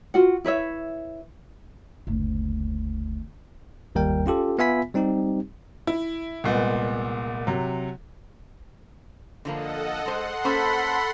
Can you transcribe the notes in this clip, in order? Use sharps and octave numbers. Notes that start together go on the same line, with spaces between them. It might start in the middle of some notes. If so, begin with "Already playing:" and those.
F4 F#4 F#5
E4 B4 C#5 E5
F#1 D2
G1 D#2 G3 A#4 G5
C#4 F4 G4 A4
B3 F4 E5 G#5 B5 B6
G3 C4 D#4 G4
E4
C2 A#2 G#3 B3
C3 F#3
D3 F3 A#3 A4 D#5 F#5
G#3 C5 F#5 C6
A#3 C#4 A4 C5 B5